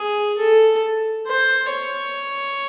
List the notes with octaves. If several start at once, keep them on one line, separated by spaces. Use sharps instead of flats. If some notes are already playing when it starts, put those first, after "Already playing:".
Already playing: G#4
A4
C5
C#5